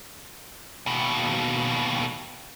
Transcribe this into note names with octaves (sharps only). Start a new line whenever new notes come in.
D#2 B2